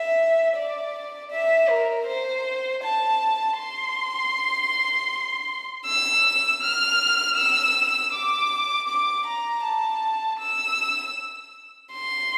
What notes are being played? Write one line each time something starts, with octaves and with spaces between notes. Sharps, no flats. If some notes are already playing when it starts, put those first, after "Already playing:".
Already playing: E5
D5
E5
A#4
C5
A5
C6
E6
F6
E6
D6
D6
A#5
A5
E6
C6